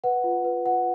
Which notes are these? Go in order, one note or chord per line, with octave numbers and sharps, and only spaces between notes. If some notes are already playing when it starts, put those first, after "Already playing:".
B4 F#5
F4
B4
F4 F#5